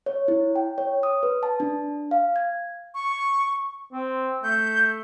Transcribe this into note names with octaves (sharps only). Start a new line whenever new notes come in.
C#5
E4
G5
C#5
D#6
B4
A5
D4
F5
G#6
C#6
C4
A3 G6